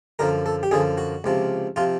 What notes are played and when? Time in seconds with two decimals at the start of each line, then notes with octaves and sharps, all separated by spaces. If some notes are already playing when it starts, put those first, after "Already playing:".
0.19 F#2 D3 F3 A#4
0.46 A4
0.63 G4
0.71 F#2 D3 F3 G#4
0.98 F#4
1.24 C#2 C3 F3
1.76 C3 F3 F4